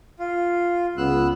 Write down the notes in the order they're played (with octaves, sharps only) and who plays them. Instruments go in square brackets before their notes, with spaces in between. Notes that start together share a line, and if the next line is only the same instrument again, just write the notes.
[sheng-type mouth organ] F4
[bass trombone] C#2 [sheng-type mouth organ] B3 E6 F#6